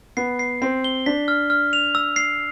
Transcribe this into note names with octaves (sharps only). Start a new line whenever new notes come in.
B3 C7
C7
C4 C7
G7
D4 B6
F6
F6
F7
E6
C7